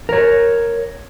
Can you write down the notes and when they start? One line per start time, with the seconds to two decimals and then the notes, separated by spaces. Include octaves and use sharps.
0.09 A#4 C#5